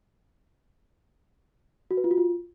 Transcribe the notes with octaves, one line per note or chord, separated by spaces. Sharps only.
F#4
B4
F4
F#4
F4